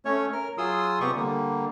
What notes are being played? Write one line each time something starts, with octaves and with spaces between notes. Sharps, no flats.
A3 C#4 C#5
A#4 F6
F#3 F4 G#4 C6 D#6 E6
C3 B3 G4 D5 C#6 D#6
D3 G3 A#3